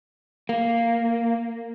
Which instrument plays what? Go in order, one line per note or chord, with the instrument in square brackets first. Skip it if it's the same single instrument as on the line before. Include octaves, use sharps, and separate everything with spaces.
[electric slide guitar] A#3